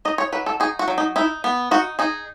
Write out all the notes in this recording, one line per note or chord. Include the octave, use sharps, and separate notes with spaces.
D#4 D#5
C#5
F#3 B4
A4
D#4 G#4
F#4
F#3
D#4
D#4 E4
B3
D#4 F#4
D#4 G#4